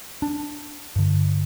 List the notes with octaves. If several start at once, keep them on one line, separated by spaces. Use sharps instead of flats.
D4
G2 D3